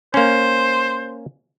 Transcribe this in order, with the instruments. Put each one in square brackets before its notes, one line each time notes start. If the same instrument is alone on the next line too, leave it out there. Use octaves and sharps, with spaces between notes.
[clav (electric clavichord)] A#3 C#4 [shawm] C5